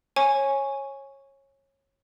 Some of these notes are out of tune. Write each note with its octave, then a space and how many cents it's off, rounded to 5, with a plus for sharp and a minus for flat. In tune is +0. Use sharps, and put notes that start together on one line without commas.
C#5 -20 G#5 +0 C#6 +0